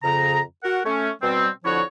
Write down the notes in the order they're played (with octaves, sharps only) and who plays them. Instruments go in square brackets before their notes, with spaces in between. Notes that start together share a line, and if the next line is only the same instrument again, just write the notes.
[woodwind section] F2 C#3 A#5
F#4 A#4 F#5
A3 C#4
B2 G3 C4
F2 D3 F3 E4 F#4 C#5